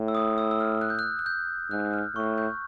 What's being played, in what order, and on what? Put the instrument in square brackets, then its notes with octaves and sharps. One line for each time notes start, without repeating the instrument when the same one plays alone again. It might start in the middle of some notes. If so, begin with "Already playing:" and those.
Already playing: [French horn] A2
[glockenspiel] E6
D#6
E6
E6
F6
F#6
G6
F#6
F#6
G6
[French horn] G#2 [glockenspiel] F#6
[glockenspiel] F6
[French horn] A2 [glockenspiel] C#6
[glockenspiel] G6